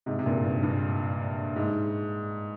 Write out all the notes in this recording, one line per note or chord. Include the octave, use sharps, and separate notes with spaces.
G#2 C3
C3
G2 A#2
G2
G2
G#2